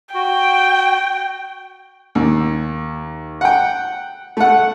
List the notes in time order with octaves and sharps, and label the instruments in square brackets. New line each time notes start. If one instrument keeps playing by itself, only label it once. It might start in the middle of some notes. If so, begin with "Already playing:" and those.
[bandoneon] F#4 [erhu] G5
[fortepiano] D#2
F#5 G5
A3 F#5